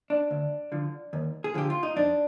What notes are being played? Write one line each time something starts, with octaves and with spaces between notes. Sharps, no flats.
D4
D2
D3 F3
D#2
G#4
D3 F3 G4
F4
D#4
F2 D4